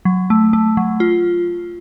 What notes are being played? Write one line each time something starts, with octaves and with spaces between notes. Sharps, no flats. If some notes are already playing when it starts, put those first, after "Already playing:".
F#3
A3
A3
F#3
F4